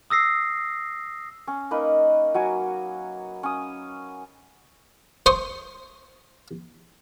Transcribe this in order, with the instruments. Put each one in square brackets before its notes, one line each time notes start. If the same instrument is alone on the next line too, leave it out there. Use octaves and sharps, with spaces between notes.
[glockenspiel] D#6 E6 A#6 C7
[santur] C#4
A#3 D#4 B4
F#3 F#4 G#5
C#4 D#6
[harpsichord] C5 C6 C#6 D#6